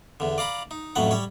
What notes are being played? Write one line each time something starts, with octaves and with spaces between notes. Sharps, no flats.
E2 D3
D5 F5 A#5 B5
D#4
A1 F2 A2 F#3 F#5
G3 C#5